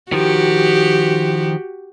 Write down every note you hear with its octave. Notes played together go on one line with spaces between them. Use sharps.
D#3 F3 F#4 G4